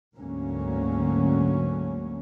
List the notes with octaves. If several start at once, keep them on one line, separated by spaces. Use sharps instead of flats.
D2 G#2 D3 F#3 A#3 C#4